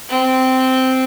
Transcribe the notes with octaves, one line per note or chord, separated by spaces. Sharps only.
C4